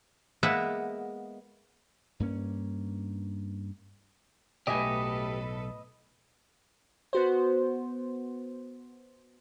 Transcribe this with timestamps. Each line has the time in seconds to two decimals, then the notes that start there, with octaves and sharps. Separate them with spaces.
0.43 G#3 A#3 B3 E5 F#5
2.20 G2 A#3 C#4
4.67 B1 A2 G4 A4 B4 D#5 E5 G#5
7.13 B3 F#4 C5